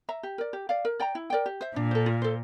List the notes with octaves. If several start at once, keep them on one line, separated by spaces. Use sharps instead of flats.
E5 A#5
G4
A#4 D5
G4
D5 F5
A#4
D5 G5 A#5
E4
A#4 D5 G5
G4
C5 E5
A#2 D4
A4 C5
F4
A4 C5